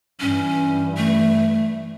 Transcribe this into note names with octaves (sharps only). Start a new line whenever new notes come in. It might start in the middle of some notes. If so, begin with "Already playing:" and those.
G2 E3 C#4
A3